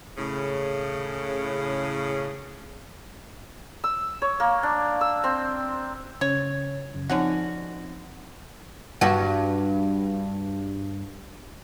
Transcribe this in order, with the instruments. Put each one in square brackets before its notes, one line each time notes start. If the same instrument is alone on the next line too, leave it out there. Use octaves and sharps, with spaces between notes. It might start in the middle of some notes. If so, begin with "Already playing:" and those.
[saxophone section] A2 C#3
[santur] E6
C#5
A#3
D4
E6
C4
[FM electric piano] C#3 C#4 A6 [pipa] C#5
[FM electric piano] F#2 C#3
[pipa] D3 C#4 F#4 [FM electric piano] F3 C4 D#4
[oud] G2 F#4